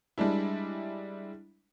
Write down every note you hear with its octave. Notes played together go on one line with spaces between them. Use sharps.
G3 G#3 D4 E4